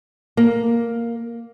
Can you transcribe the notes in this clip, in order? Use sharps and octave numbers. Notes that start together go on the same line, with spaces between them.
A#3